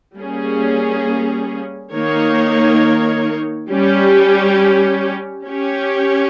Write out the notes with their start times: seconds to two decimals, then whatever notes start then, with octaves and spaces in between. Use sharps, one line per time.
0.16 G3 A#3 C#4 G#4
1.93 D#3 A#3 D#4 A#4 C#5
3.70 G3 C#4 G4
5.46 C#4 G4 C#5